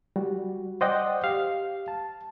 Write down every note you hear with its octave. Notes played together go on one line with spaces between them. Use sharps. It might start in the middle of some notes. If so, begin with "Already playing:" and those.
G3 F#4
C5 D5 D#5 F#5 G5
G4 F5
A5